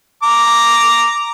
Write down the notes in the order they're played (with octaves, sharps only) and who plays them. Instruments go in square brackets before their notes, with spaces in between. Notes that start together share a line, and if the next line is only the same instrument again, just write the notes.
[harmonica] A#5 D6